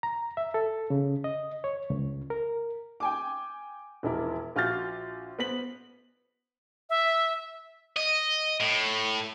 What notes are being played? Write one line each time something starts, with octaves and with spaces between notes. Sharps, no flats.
A#5
E5
A4
C#3
D#5
C#5
C#2
A#4
G5 G#5 D6
E1 A#1 E4 A#4
A#1 F4 F#4 F6 G6 A6
B3 C5 B6 F#7
E5
D#5
A2